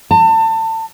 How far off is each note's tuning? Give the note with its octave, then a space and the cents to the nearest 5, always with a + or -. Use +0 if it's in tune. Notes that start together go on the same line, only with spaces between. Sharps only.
A5 +30